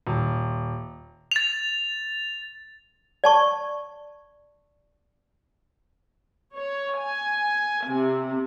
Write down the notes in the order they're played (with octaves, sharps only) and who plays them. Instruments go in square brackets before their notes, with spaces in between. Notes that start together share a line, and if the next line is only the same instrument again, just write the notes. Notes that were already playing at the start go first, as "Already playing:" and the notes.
[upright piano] D#1
[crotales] A6 F7
[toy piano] D5 A5 C#6
[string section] C#5
G#5
C3